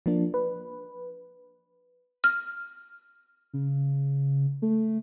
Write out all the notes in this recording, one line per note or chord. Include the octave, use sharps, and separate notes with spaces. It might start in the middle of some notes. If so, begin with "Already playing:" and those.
F3 A#3 D4
B4
F6
C#3
A3